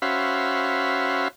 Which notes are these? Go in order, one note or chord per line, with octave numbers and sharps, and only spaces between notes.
C#4 F#4 C5 E5 F5 B5